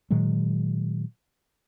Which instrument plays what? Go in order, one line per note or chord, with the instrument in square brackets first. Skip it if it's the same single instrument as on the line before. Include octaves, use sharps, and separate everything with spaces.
[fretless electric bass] A#2 D#3 F#3 G#3